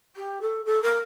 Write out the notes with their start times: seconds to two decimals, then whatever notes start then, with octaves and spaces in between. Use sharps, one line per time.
0.15 G4
0.41 A4
0.65 A4
0.82 A#4